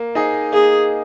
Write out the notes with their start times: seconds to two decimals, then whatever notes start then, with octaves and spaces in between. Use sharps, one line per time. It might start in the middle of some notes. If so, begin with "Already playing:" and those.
Already playing: A#3
0.15 D#4 G#4 D#5
0.53 A#3 G#4